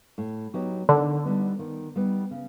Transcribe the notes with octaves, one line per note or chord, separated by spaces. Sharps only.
A2
F#3 B3 D#4 G4
D3 D#3
G3 B3 D#4
D#3
G3 B3 D#4
C#3